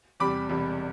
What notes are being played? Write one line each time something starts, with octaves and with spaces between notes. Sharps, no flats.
E2 C3 G3 B5 D6
E1 E2 C3 G3